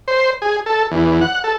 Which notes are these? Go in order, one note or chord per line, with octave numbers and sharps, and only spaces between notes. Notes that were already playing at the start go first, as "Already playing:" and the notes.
C5
G#4
A4
E2
F#5
A4